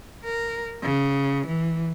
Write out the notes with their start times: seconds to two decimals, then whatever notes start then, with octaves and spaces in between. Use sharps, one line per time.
0.24 A#4
0.83 C#3
1.46 E3